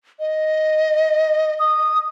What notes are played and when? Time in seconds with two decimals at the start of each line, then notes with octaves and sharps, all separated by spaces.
0.20 D#5
1.59 D#6